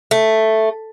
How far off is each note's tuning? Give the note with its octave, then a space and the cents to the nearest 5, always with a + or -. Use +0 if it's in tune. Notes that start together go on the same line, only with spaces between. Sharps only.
A3 +0